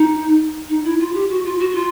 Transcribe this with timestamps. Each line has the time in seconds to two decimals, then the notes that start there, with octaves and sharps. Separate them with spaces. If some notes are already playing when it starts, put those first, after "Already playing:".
Already playing: D#4
0.69 D#4
0.84 E4
1.00 F4
1.14 G4
1.29 F#4
1.45 F4
1.59 F#4
1.70 F#4
1.75 F4